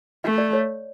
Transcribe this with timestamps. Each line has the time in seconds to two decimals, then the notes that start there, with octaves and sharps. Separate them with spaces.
0.24 A3 E5
0.38 D5
0.53 C#5